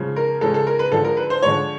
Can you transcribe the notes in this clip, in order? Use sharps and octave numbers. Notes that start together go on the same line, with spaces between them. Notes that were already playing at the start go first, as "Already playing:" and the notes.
Already playing: C#3 F3 G#3
A#4
C#3 F3 G#3 A4
A4
A#4
B4
D3 F3 G#3 A4
A#4
B4
C5
D3 F3 G#3 C#5